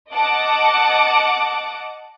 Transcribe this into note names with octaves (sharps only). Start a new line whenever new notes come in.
D#5 F#5 A5 D6